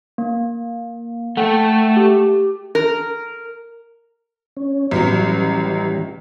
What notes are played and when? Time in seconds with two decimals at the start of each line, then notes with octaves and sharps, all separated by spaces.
0.18 A#3
1.37 A3 A4 F#5 G5
1.97 G4
2.75 A#4
4.57 C#4
4.91 A1 E3 F#3 G3